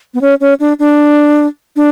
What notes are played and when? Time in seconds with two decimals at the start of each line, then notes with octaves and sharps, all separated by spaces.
0.14 B3
0.21 C#4
0.40 C#4
0.60 D4
0.79 D4
1.76 D4